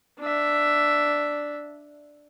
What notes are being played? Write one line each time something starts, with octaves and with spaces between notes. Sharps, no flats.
D4 E5